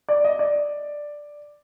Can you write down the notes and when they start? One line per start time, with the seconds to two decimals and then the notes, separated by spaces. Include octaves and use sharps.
0.09 D5
0.24 D#5
0.39 D5